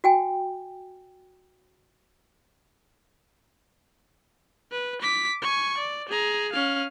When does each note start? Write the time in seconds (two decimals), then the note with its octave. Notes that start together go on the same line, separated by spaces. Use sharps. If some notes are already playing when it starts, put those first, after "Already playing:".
0.04 F#4 G5 G#5
4.72 B4
5.02 D6 B6
5.42 G#5 C#6
5.78 D5
6.09 G#4 A#5
6.53 C#4 F5